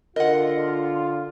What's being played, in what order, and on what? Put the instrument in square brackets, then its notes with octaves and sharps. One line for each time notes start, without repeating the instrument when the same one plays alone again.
[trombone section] D3 F4 [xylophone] A#4 [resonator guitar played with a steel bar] D#5 F#5